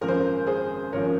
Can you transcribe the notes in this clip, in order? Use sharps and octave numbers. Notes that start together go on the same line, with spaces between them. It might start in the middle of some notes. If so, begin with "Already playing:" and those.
G#1 F#2 F3 A#4
C5
A#4
G#4 C5
G#1 F#2 F3 A#4 C#5